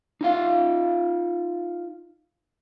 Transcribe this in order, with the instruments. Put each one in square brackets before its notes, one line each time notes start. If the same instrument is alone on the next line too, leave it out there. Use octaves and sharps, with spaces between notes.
[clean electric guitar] D#4 F4 F5